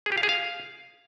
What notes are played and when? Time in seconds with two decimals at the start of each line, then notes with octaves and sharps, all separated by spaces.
0.06 G#4
0.12 G4
0.18 F5
0.23 G#4
0.29 F5